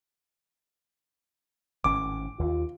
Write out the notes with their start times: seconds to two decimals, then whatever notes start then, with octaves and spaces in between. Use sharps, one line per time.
1.84 G#1 A2 C#4 D6
2.39 D#2 F4